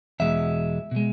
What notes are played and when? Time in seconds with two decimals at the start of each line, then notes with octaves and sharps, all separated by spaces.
0.20 E2 B2 G#3 E5
0.91 B2 G#3